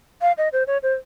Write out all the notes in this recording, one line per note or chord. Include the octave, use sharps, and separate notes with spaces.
F5
D#5
C5
C#5
C5